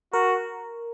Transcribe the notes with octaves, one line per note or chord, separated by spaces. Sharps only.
F#4 A#4